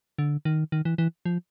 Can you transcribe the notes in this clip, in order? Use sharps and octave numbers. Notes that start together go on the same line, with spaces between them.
D3
D#3
D#3
E3
E3
F3